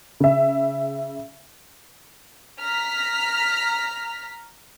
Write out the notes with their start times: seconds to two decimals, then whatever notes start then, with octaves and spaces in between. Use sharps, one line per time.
0.20 C#3 E5
2.60 A#5 F6 B6